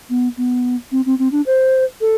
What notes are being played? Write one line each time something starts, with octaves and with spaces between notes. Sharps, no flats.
B3
B3
C4
C4
C4
D4
C5
A4